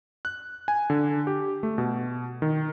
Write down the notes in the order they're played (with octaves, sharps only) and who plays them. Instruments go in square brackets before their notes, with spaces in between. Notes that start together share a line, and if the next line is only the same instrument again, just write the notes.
[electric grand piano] F#6
G#5
D3
G4
A3
B2
D#3